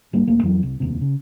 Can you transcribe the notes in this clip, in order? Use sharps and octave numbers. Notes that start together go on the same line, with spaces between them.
G#1 G3 A#3 D4
E1 A3 A#3
F2 E3 F#3
C2
F1 D#2 C3
C#3